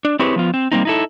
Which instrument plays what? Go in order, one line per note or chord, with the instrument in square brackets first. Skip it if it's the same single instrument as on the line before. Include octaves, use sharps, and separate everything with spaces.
[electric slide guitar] D4
C4 E4 G4 G#4 B4 C#5
F3 B3 F4
C4
G3 A#3 C4 D#4
D#4 E4 A4